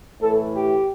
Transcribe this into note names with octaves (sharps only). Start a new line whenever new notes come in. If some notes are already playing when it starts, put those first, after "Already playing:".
A2 E3 A4
G4